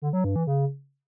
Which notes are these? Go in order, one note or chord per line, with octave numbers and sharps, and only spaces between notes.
D3
F#3
G2
E3
C#3